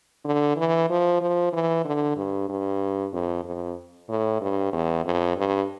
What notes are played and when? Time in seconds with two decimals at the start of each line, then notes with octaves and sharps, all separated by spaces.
0.25 D3
0.57 E3
0.90 F3
1.21 F3
1.53 E3
1.84 D3
2.16 G2
2.49 G2
3.13 F2
3.44 F2
4.09 A2
4.41 G2
4.73 E2
5.05 F2
5.36 G2